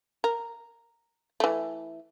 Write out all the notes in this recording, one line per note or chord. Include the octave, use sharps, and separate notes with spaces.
A#4
E3 A3